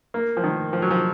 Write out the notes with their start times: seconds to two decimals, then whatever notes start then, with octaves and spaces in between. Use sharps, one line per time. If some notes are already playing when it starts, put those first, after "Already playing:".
0.14 A#3
0.37 F3
0.44 D#3
0.73 F3
0.82 F#3
0.91 F3